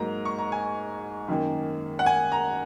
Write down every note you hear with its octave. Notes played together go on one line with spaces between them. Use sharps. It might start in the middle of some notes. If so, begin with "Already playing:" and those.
Already playing: G#2 F#3 A#3 A#5
C#6
A#5
G#5
F#2 D#3 A#3
F#5
G#5
A#5